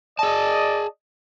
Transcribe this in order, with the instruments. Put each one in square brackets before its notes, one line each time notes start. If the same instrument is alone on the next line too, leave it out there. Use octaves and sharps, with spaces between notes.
[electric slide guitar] G#4 A5 [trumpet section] D5 D#5